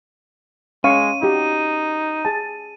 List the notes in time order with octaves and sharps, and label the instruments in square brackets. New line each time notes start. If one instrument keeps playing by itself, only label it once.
[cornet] G#3 [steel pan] C#4 F5 C#6 [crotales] D#7
[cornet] D#4 [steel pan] F#4 G4
[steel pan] G#4 A5